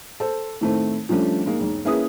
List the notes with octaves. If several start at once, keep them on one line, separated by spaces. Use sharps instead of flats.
A4 C5
A2 D#3 A3 C4
F3 G3 A3 C#4 D4
G#2 G#3 A#3
E1 G#2
A#3 C#4 E4 G#4 B4 D#6